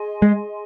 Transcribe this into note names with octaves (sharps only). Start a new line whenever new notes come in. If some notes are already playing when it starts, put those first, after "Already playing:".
Already playing: G#4 D#5 G#5 C6
G#3